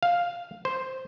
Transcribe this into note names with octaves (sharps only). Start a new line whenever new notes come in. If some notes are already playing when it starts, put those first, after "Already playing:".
F5
C5